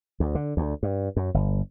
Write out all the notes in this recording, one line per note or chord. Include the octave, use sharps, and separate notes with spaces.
D2
D3
D2
G2
F#2
G1